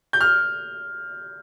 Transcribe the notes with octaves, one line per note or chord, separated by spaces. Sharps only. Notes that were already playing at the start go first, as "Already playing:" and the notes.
G6
F6